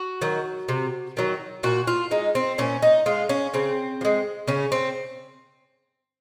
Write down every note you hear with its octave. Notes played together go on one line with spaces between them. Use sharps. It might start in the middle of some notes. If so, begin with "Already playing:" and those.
Already playing: F#4
D#3 F#3
C3
D#3 F#3
A#2 F#4
F4
G#3 D#4
C4
A#2 C#4
D#4
G#3 F4
C#4
C#3 C4
F3
G#3
C#3 C#4
C4